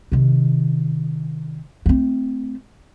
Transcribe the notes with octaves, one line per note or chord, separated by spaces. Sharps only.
C3 D#3
A3 C4